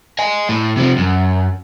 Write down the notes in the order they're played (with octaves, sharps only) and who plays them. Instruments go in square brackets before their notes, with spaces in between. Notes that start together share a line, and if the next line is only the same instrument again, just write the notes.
[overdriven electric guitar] D#5 G#5
A2
C3 F3
F#2